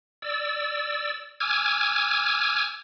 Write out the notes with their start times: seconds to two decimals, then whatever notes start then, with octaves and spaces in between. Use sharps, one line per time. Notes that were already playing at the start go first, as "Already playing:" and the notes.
0.22 D5 E6
1.40 G#5 D6 E6 F6 G#6